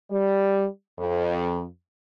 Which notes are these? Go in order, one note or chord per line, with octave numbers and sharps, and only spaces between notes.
G3
F2